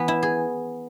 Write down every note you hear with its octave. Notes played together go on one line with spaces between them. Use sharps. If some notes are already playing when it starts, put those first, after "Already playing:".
Already playing: E3 B3 B4
E4
G#4